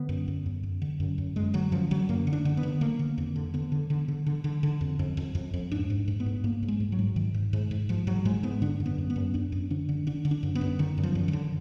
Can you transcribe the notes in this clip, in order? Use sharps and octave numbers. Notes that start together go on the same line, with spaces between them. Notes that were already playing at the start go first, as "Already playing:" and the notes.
Already playing: D3 B3
F#2
F#2
F#2
F#2
D3
F#2
F#2
F#2 G#3
D3 F#3
F#2 F3
D3 F#3
F#2 A#3
D3
D4
D3
B3
D3
D3 A#3
D3
F2
D3
D3 B3
D3
D3
D3
D3
D3
D3
F2
F2
F2
F2
F2
G#2 D4
G#2
G#2
B3
G#2
G#2 A#3
G#2
G#3
G#2
F#3
G#2
G#2 D#3
G#2
G#2
G#2
G#2 F3
G#2 F#3
G#2 G#3
G#2 B3
D3 D4
F#2
B3
F#2
B3
F#2
F#2 D4
F#2
D3 D4
D3
D3 D4
D3
D4
F#2
B3
F#2
D3 D#3
F#2
F3
F#2
D#3
D3